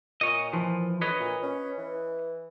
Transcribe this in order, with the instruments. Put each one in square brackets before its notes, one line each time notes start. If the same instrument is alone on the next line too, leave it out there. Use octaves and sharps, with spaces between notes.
[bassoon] A#2 [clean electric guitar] C#5 D#5
[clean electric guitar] E3 F3
[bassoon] D2 [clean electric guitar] B4 C#5 D#5
[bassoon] A#2
C#4
E3